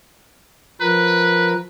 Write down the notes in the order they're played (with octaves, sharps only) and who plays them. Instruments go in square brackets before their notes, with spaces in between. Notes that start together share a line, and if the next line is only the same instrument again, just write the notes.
[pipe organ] F3 A#4 [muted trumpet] B4